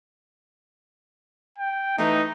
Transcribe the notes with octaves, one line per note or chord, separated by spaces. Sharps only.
G5
E3 A3 D#4